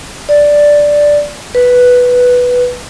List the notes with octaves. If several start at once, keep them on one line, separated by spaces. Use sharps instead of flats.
D5
B4